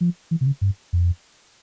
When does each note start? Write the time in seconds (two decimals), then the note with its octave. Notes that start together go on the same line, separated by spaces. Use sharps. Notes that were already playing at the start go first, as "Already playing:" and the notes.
0.01 F3
0.31 E3
0.41 C3
0.47 C#3
0.61 G2
0.93 F2